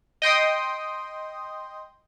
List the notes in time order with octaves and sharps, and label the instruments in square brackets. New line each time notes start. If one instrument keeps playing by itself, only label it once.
[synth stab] D#5 G5 C6 D#6